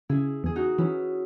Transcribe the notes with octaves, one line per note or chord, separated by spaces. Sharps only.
C#3 E4 G#4
E2 G#4
D#4 F#4
E3 C#4 E4